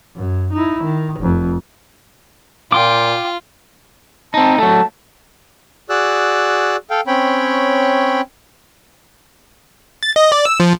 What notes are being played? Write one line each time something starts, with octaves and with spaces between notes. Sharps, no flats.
F#2
D#4 E4
D#3
F1 F2
A#2 F4 G5 C6 D6
C4 D#4 A5
F#3 A3 A5
F#4 G#4 D5 E6 F#6
A4 F5 G5
C4 C#4 C#5 G5 B5
A6
D#5
D5
E6
F3